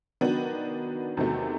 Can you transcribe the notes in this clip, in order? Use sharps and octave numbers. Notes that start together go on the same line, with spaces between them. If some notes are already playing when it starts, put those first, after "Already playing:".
D#3 F#3 B3 D4
E2 C3 D#3 F#3 A3